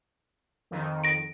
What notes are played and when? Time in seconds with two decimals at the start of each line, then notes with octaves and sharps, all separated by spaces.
0.71 F2 D#3
1.04 A#6 D7